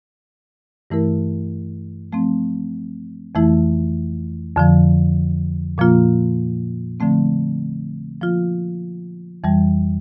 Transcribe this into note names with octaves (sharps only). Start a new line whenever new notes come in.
G2 E3 A3 E4 A#4
F3 A3 C4
F2 E3 A3 E4
F2 D3 F3
A#2 F3 A#3 F4
D3 F3 A3 C4
F3 A#3 F4
F2 E3 G3